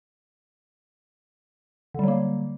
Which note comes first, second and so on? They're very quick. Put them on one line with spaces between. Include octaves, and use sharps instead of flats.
D3 G3 F#3 A#3